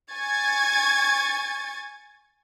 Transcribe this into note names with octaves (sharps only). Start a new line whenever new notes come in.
G#5 C#6 G#6 A6